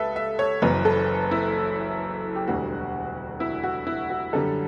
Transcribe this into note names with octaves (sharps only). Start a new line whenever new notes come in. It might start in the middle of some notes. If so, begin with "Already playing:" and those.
Already playing: C#2 G3 A4 B4 E5
E5
C#5
F#1 F#2 E3 B4
A4
E4
G4
E1 D2 D3 G3 F#4
E4
F#4
E4
F#4
F#2 D3 G3 A4